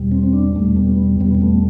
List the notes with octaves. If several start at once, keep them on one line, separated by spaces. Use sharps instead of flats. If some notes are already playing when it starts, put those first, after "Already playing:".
Already playing: E2 B2 G3
C4
C4
D4
E2 B2 G3 A3
B3
E2 B2 G3 B3
B3
A3